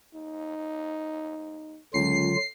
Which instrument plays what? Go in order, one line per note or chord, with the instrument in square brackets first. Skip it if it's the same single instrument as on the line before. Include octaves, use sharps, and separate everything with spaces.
[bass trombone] D#4
[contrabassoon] C#2 [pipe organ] D3 F#3 F4 [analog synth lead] C7